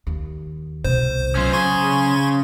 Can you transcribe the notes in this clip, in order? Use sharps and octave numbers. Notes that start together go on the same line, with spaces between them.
D#2
C2 B2 C5
F#3 C#4 F4
C#3 G#5 C6 C#6 G#6